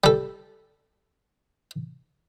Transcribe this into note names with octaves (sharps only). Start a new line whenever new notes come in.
G3 A4